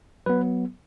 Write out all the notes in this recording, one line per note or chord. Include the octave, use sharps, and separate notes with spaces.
F#3 B3 B4